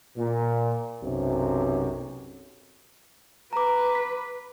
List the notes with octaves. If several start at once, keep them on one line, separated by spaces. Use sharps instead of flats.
A#2
B1 F#2 C3
B4 A#5 D6
B6